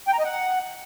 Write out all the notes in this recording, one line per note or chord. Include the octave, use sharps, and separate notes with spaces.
G5
A#5
D#5
F#5